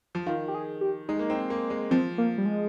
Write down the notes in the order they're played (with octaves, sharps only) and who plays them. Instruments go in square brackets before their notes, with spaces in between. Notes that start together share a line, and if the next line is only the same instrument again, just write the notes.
[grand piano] F3
[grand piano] D#3 [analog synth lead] F4
[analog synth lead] G4
G#4
G4
[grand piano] G#3 [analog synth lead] D#4
[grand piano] A#3
C4
A#3
G#3
[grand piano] F3 [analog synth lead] C4
[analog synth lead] A#3
G3
G#3